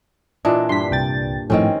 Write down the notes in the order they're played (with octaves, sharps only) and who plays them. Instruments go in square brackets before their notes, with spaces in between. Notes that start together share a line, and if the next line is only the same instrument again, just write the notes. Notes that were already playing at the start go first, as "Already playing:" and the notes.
[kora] A#2 E3 D4 [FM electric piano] D#5
[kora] G2 [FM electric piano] C6 B6
[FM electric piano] C2 G5 A6
[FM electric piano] G#1 F2 A2 [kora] D#3 C4 C#4